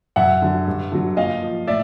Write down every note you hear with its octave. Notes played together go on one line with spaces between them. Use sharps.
F#2 E5 F#5
D3 F#3
G2
D3 F#3
A#2 D#5 F5
F3
A2 D5 E5